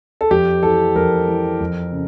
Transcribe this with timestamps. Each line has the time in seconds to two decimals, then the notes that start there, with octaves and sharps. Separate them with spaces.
0.21 A4
0.31 F2 G4
0.62 E3 A4
0.96 F2 A#4
1.28 E3
1.60 F2
1.92 C#3